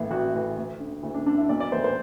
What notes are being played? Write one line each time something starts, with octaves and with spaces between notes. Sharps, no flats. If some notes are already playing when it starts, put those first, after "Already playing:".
Already playing: A1 A2 E3
A1 F#4
A2 E3
D2
D3
D2 E4
D4
D3 D4
E4
B1 D5
D5
A2 E3 C5
C5